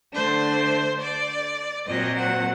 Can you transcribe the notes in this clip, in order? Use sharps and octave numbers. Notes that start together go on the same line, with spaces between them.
D3 A3 D4 C5
D5
A#2 F#3 C4 D#5
F#5